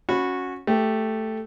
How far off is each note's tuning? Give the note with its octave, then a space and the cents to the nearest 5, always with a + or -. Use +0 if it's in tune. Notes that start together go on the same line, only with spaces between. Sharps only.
C#4 -5 F#4 -15 B5 +0
A3 +0 G4 +0